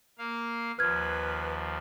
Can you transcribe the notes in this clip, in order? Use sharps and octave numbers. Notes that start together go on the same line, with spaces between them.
A#3 F5
D#2 F3 B4 F6 G#6